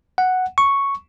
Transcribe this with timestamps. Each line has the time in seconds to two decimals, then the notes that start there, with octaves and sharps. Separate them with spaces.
0.18 F#5
0.58 C#6